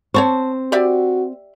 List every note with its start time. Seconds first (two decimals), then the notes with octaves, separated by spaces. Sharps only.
0.14 C4 C5 C#5 A5 C#6
0.72 F#4 G4 D5 E5